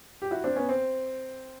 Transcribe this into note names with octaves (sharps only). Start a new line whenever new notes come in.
G4
E4 F#4
C4 D4
B3 C#4
C4